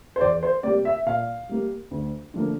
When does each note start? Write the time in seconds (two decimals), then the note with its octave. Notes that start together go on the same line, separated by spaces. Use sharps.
0.16 C5
0.21 E2 D5
0.43 C5
0.63 C3 G3 A#3 D5
0.85 E5
1.06 A#2 F5
1.49 G3 A#3
1.91 D2
2.34 D3 F3 A#3